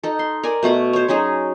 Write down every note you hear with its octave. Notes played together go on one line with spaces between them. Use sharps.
D#4 A4
C6
A#4 D5 G#5
B2 A3 F#4 F#5
C5 C#5
F#3 C#4 D#4 G#4